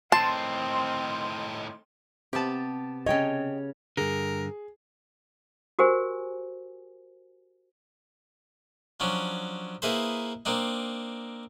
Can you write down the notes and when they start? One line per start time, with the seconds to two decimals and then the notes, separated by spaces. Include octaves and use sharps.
0.12 A2 D#3 C4 A5 C6
2.33 C3 B3 G4 A5
3.06 C#3 C#5 D#5 G5
3.97 G2 D3 G#4 A#4
5.79 F#4 G4 A#4 C5 G#5
9.00 F3 F#3 C#4 D4
9.82 A#3 D#4 E4 G#4 B4 C5
10.45 A#3 C4 D4 D#4